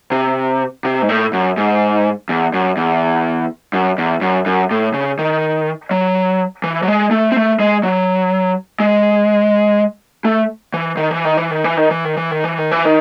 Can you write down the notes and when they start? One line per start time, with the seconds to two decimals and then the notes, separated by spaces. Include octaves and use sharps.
0.12 C3
0.85 C3
1.02 G#2
1.09 A2
1.33 F#2
1.57 G#2
2.29 E2
2.54 F#2
2.77 E2
3.73 F#2
3.98 E2
4.22 F#2
4.46 F#2
4.71 A2
4.94 C#3
5.19 D#3
5.91 F#3
6.64 E3
6.83 F#3
6.88 G#3
7.11 A3
7.32 C4
7.36 A3
7.60 G#3
7.83 F#3
8.80 G#3
10.25 A3
10.74 E3
10.97 D#3
11.11 E3
11.25 D#3
11.37 E3
11.51 D#3
11.64 E3
11.77 D#3
11.91 E3
12.05 D#3
12.17 E3
12.31 D#3
12.44 E3
12.58 D#3
12.71 E3
12.85 D#3